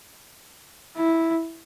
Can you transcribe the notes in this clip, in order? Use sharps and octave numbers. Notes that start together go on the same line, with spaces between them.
E4